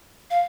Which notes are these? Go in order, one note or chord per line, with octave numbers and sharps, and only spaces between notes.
F5